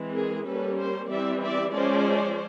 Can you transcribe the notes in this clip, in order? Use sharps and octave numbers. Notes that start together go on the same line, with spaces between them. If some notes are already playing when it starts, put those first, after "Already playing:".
Already playing: E3 G#3 C4
G#4 A#4
G3 A#3 C#4 A4 B4
A#4 C5
E3 G3 C4 D5 E5
D5 E5
F3 G#3 C#4 C5 D5